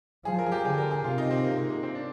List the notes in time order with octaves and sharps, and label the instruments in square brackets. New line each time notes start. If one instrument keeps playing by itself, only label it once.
[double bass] F3 [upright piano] G#4
[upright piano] A#4
G#4
G4
[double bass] D3 [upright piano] G#4
[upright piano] A#4
G#4
[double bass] C3 [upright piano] F4
[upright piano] D#4
C4
A#3
G#3
A#3
C4
D4